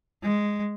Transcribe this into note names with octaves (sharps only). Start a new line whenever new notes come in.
G#3